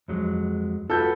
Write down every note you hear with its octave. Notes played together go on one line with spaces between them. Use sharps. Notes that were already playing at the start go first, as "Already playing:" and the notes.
F2 F#3 G#3
F4 F#4 A4 B4 G6